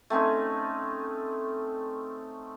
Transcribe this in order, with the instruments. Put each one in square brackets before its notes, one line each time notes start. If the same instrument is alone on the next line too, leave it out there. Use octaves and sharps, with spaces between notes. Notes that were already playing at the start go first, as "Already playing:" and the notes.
[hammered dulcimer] A3 C4 C#4 D#4